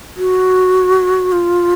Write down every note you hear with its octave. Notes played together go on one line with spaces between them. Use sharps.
F#4
F4